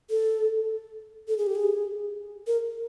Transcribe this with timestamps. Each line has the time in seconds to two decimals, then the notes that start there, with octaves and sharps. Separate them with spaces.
0.10 A4
1.28 A4
1.38 G#4
1.47 G4
1.55 G#4
2.47 A#4